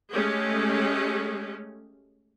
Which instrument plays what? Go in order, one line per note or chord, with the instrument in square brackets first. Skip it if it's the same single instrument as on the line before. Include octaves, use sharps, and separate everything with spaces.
[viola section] G#3 A3 C#4 G4 G#4